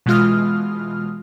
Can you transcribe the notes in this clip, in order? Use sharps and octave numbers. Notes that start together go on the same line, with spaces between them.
B2 E3 G#3 F4 D#6 F6